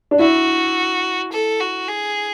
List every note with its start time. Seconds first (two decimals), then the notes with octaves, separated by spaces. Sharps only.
0.11 D4
0.19 E4 F#4
1.32 A4
1.60 F#4
1.89 G#4